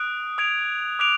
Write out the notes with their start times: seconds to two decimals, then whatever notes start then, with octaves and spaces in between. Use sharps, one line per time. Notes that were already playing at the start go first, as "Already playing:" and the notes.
Already playing: D#6 F#6 D7
0.38 D#6 G#6 D7 F7
0.99 D6 F#6 D7 F7